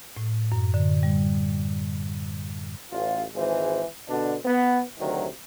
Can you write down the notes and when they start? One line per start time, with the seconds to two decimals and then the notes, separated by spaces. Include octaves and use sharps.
0.17 A2
0.52 F#2
0.74 D3
1.03 G3
2.92 A1 F4
3.34 G#1 E3 G#3 C5
4.09 B2 D3 D4
4.45 B3
4.99 D2 C3 D#3 F#3